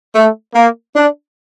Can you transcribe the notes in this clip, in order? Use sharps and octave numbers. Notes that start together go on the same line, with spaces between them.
A3
A#3
D4